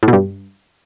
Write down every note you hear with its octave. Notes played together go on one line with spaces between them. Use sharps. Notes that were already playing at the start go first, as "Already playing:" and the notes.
A2
B2
G2